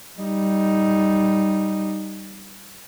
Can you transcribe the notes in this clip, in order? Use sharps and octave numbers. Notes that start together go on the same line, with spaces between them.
G3 D#4